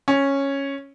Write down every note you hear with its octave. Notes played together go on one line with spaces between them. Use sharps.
C#4